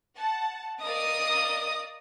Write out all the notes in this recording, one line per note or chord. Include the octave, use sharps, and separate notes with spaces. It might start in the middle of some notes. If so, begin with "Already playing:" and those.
F#5 A5
A#4 D5 D#5 F5 D#6